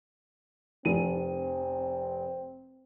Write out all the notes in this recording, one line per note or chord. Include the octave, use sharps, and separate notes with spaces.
F1 C4 D#7